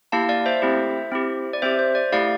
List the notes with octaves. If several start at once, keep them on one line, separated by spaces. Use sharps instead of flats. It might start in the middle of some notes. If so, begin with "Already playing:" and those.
A#3 E4 G4 F5 A5
D5 F5
C5 E5
A3 C4 E4 G4
C4 E4 G4
D5
C4 G4 C5 E5
C5
D5
A3 E4 G4 D5 F5